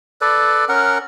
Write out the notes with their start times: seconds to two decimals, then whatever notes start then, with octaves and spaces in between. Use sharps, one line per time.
0.21 A4 B4 D5
0.69 C#4 A#4 F#5